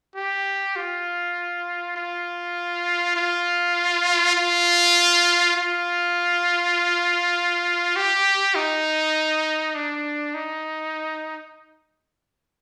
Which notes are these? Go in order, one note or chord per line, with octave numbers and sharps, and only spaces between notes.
G4
F4
F4
F4
F4
F4
G4
D#4
D4
D#4